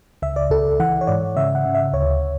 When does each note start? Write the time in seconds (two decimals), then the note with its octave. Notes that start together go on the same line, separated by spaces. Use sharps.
0.22 C#2 E5
0.36 D5
0.50 C#2 A4
0.80 E3 F#5
1.01 C#5
1.07 G#2 D5
1.36 C#3 E5
1.55 F#5
1.66 C#3
1.75 E5
1.93 D2 C#5